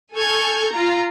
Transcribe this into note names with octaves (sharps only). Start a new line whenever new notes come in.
A4 G#5 C#6 F6 G6 G#6
F4 A#5